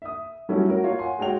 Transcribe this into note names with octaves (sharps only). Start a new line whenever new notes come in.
E5 D#6
F#3 G3 A3 C#4 E4 F#4
F#4 A#4 C#5
F4 C#5 F5
F#5 G#5 C6
G#3 F#4 C#5 G5 F7